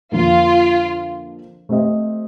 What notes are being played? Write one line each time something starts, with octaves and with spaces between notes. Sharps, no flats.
F2 D3 F3 A#3 F4
A3 C4 G4 C5 D#5